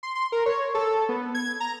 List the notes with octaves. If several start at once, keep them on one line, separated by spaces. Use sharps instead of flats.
C6
C6
A#4
C#5
A4
B3
G#6
A#5